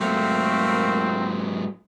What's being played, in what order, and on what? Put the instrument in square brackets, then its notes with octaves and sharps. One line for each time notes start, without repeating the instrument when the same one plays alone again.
[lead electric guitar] G#2 F#3 [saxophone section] A3 A#3 [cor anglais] C4